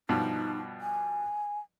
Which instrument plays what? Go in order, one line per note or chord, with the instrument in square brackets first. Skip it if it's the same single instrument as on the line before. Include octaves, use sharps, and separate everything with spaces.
[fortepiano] G2 B2 F3 [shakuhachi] D#4
[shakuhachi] G#5